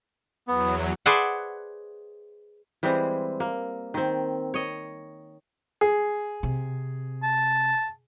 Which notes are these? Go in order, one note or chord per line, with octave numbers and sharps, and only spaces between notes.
E2 F#3 B3
G#4 B4 C5 D5 E5 F#5
E3 G3 G#3 C4
A#3
D#3 C4
C#5 D#5
G#4
C3
A5